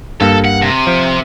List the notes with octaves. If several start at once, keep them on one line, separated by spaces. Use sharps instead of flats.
G2 A#3 A4
F#5
C3
F3